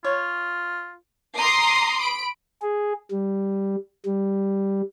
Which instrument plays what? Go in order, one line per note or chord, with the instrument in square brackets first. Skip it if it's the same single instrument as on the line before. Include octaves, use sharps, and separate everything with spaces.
[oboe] F4 [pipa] C#5
[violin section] A#5 C6 D6 D#6 C7
B5 D7
[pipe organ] G#4
G3
G3